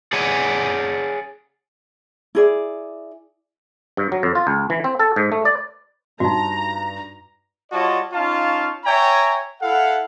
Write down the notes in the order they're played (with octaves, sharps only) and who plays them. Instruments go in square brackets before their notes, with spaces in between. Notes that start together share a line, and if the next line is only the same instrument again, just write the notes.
[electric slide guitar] G#4 C#5 D5 F#5 G#5
[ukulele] E4 G#4 D5
[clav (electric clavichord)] G2
F#3
F2
F4
C#2
E3
C4
A4
G#2
A3
D5
[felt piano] G2 [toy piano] D#4 F#4 [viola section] A#5
[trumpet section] G3 F4 F#4 C#5 D#5 A5
C#4 D#4 F4 F5 A5 C#6
C#5 E5 G5 G#5 A#5
E4 A4 F5 F#5